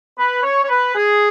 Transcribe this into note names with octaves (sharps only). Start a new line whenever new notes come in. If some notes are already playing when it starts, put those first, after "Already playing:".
B4
C#5
C#5
B4
G#4